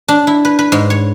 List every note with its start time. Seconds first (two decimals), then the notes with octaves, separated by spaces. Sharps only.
0.08 D4
0.27 E4
0.45 B4
0.59 B4
0.72 G#2
0.90 C#5